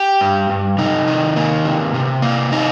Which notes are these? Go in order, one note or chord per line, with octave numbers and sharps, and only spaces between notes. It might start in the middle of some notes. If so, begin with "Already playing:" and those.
Already playing: G4
G2
G2
C3 D#4
D#3
A#3
C3
C3
A#3
C3 D#4